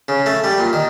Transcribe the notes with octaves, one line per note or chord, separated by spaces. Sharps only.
C#3
A3
G3
A#2
D#3